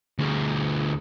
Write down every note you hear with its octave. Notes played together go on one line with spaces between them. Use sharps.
D2 G#4